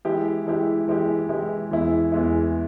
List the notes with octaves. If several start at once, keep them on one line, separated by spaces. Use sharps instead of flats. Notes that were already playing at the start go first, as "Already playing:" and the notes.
E3 G#3 E4 G4
E3 G#3 E4 G4
E3 G#3 E4 G4
E3 G#3 E4 G4
E2 E3 G#3 E4
E2 E3 G#3 E4